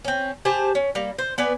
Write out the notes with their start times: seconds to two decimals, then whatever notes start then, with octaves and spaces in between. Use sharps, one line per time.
0.04 C4 C#4
0.45 G4 G#4 C5 A5
0.75 C#4
0.95 G3 A#3
1.18 C5
1.38 B3 B4 D5 G#5